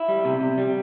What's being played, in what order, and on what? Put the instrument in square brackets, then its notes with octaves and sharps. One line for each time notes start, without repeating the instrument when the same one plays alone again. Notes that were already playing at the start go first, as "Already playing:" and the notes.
Already playing: [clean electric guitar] E4
G3
C3
C3
G3